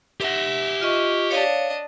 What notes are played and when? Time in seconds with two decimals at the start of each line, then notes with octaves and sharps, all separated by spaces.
0.20 G4 E5 F#5
0.81 F4 D#5 C#6
1.30 D4 C#5 D#5 F5